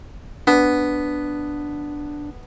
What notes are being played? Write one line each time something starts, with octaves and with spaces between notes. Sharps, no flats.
B3 D4